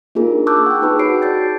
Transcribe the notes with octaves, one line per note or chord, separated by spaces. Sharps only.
A#3 D4 D#4 F4 G#4 A#4
A5 C#6 D6 E6 F#6 G6
F#5 G5
D#4 G#4 B4 A5 B5
F#4 C#5 A5 C7 D7
D5 G6 A6